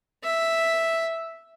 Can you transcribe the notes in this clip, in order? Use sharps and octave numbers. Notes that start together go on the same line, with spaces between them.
E5